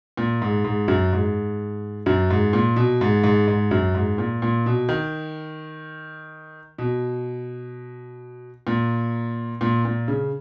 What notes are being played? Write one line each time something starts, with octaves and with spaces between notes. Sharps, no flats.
A#2
G#2
G#2
F#2
G#2
F#2
G#2
A#2
B2
G#2
G#2
G#2
F#2
G#2
A#2
A#2
B2
D#3
B2
A#2
A#2
A#2
C#3